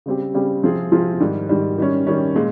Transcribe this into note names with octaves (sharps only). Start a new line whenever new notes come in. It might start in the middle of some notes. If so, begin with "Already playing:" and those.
C#3 G3 C4 G4
C#3 G3 C4 G4
C3 F3 C4 F4 G#4
C3 F3 C4 F4 G#4
G#2 D#3 G3
G#2 D#3 G3
D#3 G3 C#4
D#3 G3 C#4
A#2 G#3